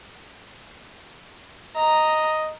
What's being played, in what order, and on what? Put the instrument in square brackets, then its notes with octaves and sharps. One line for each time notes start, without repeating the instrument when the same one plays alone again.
[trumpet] D#5 [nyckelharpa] A#5